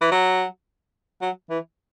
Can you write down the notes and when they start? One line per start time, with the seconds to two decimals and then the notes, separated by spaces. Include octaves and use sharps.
0.01 E3
0.11 F#3
1.22 F#3
1.50 E3